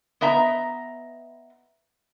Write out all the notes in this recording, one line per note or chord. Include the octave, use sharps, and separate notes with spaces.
B3 D#5 E5 A#5